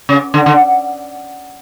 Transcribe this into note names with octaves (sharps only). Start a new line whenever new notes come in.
C#3
D3
D3